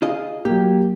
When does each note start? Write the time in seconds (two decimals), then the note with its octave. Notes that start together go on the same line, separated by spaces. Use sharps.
0.02 F4 G#4 D#5
0.45 F#3 A#3 G4